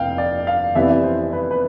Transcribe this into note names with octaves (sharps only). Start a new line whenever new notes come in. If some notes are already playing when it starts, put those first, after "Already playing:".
Already playing: F1 F5 G5
D5
F5
F1 F2 E3 G3 B3 E5
D5
E5
C5
B4
B4